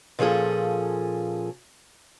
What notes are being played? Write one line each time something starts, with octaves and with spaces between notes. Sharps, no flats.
A#2 F3 C#4 G#4 A4